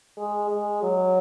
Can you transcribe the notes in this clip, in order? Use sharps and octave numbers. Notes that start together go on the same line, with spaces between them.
G#3
G#3
F#3